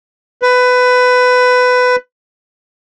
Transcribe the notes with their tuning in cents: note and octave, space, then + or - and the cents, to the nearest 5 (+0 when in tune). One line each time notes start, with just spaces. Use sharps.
B4 +15